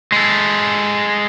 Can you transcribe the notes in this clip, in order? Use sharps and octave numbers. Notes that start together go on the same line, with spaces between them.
G#3 A4